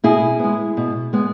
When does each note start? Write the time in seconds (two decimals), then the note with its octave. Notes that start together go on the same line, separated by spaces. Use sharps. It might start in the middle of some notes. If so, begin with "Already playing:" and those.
0.04 B2 E4 G#4
0.40 G#3 B3
0.77 B2
1.13 G#3 B3